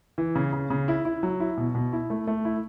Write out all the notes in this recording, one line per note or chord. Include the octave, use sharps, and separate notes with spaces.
E3
C#3
C#3
C#3
E4
E4
F#3
E4
B2
B2
E4
A3
A3
E4